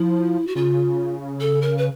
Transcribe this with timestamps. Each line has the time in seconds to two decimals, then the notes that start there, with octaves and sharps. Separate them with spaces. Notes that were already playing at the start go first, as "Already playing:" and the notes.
Already playing: F3 E4
0.47 F#4
0.56 C#3 F4
1.40 A4
1.62 A#4
1.78 B4